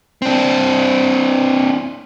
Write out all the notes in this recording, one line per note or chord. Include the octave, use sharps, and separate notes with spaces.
C4 D4